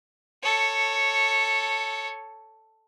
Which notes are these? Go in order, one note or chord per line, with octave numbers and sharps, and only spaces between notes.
A4 C#5